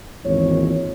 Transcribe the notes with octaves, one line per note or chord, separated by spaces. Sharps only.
G#1 E2 A#2 C#5